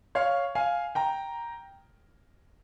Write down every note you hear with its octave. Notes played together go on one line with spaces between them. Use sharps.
C#5 F5
F5 G#5
G5 A#5